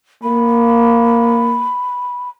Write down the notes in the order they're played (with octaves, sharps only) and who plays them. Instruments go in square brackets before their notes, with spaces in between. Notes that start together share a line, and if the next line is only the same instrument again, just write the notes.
[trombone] A#3 [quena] B5